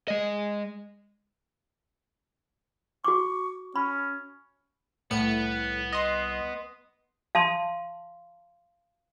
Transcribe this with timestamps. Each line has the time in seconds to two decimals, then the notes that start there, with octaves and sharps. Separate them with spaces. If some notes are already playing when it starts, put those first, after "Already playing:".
0.08 G#3 D#5
3.04 F#4 C#6 D6
3.76 C#4 B5
5.11 C2 A2 B3 C#7
5.92 D#5 C6
7.35 F5 A5 C6